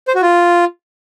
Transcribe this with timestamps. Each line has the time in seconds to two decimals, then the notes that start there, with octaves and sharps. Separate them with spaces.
0.08 C5
0.15 F#4
0.22 F4